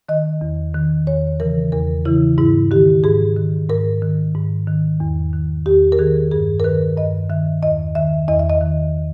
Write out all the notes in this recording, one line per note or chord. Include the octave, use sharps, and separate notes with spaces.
D#3 D#5
E2
D#3
E2 C#5
C#3 E3 A#4
E2 A#4
C#3 E3 E4
G#2 E4
D#3 G4
G#2 G#4
D#3
G#2 A#4
D#3
G#2
D#3
E2
D#3
E2 G4
A#4
D#3 G#4
G2 G#4
A#4
D#3 B4
G2 D#5
D#3 E5
E2 D#5
D#3 E5
E2 D#5
E5
D#5
D#3